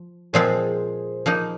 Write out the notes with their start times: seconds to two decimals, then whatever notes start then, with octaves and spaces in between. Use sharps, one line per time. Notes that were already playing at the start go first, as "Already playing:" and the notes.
Already playing: F3
0.33 A#2 F3 G#3 C4 F4 G#4 C5
1.26 F3 A#3 D#4